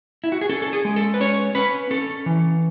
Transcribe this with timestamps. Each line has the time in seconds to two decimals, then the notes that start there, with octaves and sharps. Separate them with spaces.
0.24 E4
0.32 F#4
0.41 G#4
0.49 C#4 A4
0.62 A4
0.73 G#4
0.85 G#3
0.96 A4
1.14 B4
1.21 C#4 C#5
1.55 C#4 B4
1.91 C#4 A4
2.26 E3